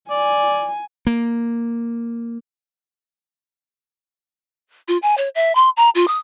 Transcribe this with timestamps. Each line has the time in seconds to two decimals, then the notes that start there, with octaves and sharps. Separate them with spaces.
0.10 D5 G#5
1.07 A#3
4.88 F4
5.02 G#5
5.17 C#5
5.35 E5
5.55 C6
5.77 A#5
5.95 F4
6.08 D#6